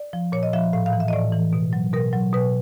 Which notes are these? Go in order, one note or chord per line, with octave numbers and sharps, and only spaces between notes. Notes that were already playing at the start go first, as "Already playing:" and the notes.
Already playing: D5
F3
A#2 C#5
D#5
F3 E5
A2 F5
F5
E3
E5
D#5
A2 D5
E3
B2
F#3
B2 A#4
F#3
B2 B4